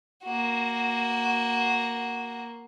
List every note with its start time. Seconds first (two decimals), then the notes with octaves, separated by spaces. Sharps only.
0.23 A#3 F#4